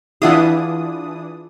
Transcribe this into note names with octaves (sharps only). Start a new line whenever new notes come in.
E3 D4 E4 F4 G#4 E5 F#5 D#6